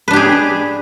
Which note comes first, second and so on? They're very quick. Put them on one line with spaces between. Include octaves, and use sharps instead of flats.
B4 D4 G4 G#4